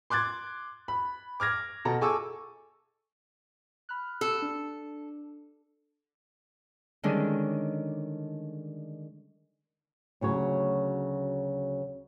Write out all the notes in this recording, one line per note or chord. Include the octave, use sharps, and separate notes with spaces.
C6 D6 F#6 G#6 A6
B5
D6 F6 G#6 A#6
B2 A4 A#5
G#4 A4 G#5 C#6 D6 E6
B5 F6 F#6
A4
D4
D3 D#3 G3 G#3 C#4 D4
D2 C#3 F#3 C#5